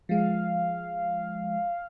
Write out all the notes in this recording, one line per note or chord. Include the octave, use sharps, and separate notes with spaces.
F3 G#3 F5